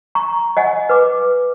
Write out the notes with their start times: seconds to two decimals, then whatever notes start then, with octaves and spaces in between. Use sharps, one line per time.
0.15 A#5 C#6
0.57 D#5 F#5 G#5
0.89 B4 D6